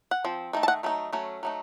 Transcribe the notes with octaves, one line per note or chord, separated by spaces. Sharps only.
F#5
F3 C4
D#3 A3 D#4
A5
F#5
F#3 A3 D#4
F#3 A3 C#4
F#3 A3 D#4